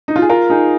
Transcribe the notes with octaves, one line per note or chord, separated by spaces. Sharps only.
D#4
F4
G#4
F4 A#4
D#4 G#4